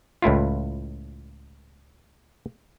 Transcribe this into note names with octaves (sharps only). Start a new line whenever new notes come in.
C#2 A2 E4 F4